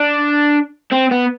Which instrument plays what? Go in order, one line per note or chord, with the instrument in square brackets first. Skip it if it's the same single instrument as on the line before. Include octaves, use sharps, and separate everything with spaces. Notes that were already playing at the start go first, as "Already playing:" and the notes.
Already playing: [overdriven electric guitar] D4
C4
B3